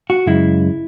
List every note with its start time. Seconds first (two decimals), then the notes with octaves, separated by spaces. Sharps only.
0.10 F#4
0.26 F#2 C#3 G#3 E4